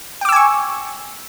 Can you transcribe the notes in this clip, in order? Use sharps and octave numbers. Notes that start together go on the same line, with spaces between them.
G5 G#5 C#6 D6 E6